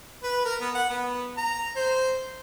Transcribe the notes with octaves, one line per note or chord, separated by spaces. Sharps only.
B4
A#4
B3
F#5
B3
A#5
C5